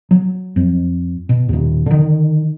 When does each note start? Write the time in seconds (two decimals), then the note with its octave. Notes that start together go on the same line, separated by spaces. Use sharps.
0.11 F#3
0.56 F2
1.29 B2
1.49 D#2 A#2 D#3
1.86 D3 D#3